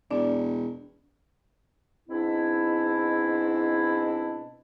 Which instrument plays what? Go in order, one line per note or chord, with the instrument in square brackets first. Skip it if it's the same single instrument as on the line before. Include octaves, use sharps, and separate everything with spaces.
[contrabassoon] E1 [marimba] D4 D5
[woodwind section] G#2 B2 C4 D4 E4